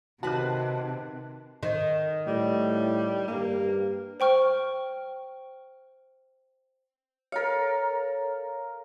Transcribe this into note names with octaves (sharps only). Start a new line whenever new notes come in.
C3 D#3 F#4 B4 A5 F#6
D#3
A2 G3
G2 A#3
C5 G5 C#6 F6
A4 A#4 C#5 F5